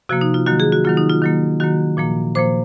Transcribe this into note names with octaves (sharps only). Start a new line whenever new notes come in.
C3 F3 A#3 F#4
D#4
F4
D#3 F#3 A#3 F#4
G#4
F#4
D#3 F#3 A#3 F4
D#4
F4
D#3 F#3 A#3
D#3 F#3 A#3 F#4
A#2 F3 A#3
A#2 F3 A#3 C5